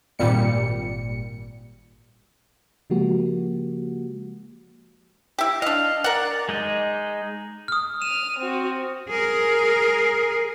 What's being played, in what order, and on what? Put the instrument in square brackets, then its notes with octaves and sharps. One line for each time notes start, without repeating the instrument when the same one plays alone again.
[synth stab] G#1 A#2 G3 C#7
[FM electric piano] C#3 F3 G#3 A#3 F#4 G4
[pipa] E4 G4
[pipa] D4 D#5 [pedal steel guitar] F5
[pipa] A#4 F#5 [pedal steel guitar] D5
[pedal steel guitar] G#3 D#4 D#5
[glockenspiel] D#6 F6
[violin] F6 D#7 [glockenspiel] E7
[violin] C4 F#4
[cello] G#4 A#4